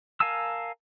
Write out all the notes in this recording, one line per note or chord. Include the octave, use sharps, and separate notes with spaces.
A#4 F5 G#5 A5 E6